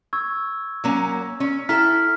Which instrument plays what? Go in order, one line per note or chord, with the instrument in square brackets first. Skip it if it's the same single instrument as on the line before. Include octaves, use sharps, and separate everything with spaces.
[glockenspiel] C#6 E6 G#6
[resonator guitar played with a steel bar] F#3 A#3 C#4
C#4
[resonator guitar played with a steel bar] E4 A4 G5 [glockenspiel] A#5 F6 B6